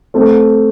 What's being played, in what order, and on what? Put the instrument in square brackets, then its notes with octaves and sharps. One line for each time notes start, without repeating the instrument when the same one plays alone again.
[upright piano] A3 C4